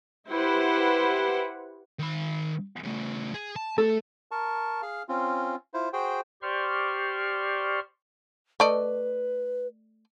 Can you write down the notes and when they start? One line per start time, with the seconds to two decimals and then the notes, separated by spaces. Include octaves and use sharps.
0.27 E4 G4 B4 C5 F#5
1.99 D#3 B5
2.83 C#3 A3
3.34 G#4
3.56 A5
3.78 A3 A4
4.31 A#4 A5 C#6
4.82 G#4 F5 F6
5.09 C4 C#4 F4
5.74 E4 F4 C5
5.93 F#4 G#4 C5 G5
6.42 G4 C5 D5 C6 C#6 F6
8.60 A3 B4 D5 D#5